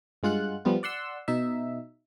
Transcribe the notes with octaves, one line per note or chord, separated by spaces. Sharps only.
G2 G#3 F4 F#5 F#6
F3 G3 B3 F4
D5 F#5 C6 E6
B2 D#4 E5